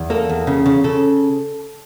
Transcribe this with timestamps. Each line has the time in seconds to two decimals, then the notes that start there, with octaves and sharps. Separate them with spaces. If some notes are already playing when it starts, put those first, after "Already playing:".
Already playing: E2
0.10 A#3 A4
0.29 E2
0.47 C#3
0.66 C#3
0.84 C#3 A4